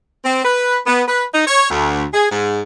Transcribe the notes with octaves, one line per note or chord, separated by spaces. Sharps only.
C4
B4
B3
B4
D#4
C#5
D2
G#4
G#2